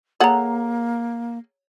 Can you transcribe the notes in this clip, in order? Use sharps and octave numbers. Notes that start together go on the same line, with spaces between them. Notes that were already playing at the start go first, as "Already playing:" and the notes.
A#3 G#4 A4 C#5 F#5 A#5